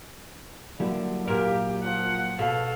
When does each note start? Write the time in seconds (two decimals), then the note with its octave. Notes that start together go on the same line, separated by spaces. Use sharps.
0.80 D3 F#3 G3 A#3 E4
1.28 A#2 G4 A#4
1.83 F3 F#5
2.39 B2 A4 F5